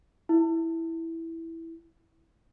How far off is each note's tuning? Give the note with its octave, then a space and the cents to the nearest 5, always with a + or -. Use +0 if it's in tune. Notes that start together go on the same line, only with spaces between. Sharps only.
E4 -5